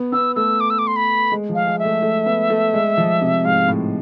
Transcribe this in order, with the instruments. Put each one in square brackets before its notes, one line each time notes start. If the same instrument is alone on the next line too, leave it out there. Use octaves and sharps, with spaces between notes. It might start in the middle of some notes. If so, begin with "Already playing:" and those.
Already playing: [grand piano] B3
[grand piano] B3 [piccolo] E6
[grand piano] A3 [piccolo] E6
[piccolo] D6
E6
D6
C6
B5
[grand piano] G#3
F3
[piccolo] F5
[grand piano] G#3
[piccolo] E5
[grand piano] A3
A3
B3
A3
G#3
F3
C3
[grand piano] G#2 [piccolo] F5
[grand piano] A2